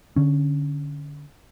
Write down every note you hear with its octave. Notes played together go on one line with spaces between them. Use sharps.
D3 C#4